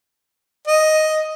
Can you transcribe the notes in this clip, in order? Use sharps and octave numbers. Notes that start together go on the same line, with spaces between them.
D#5